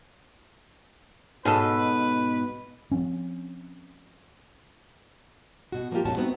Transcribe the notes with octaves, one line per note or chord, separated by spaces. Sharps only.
G#2 B2 C#4 G#4 A4 B4
F3 C4 C#4
B2 F#4
F3 A#3 C4 D#4 F4 G4
F2 A#2 C#4 F#4 A5
A3 B3 C4 D#4 F#4